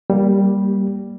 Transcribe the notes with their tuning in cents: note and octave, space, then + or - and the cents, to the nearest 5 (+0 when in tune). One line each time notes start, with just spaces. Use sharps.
G3 +0 A#3 +10